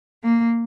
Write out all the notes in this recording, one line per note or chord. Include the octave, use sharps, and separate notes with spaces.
A#3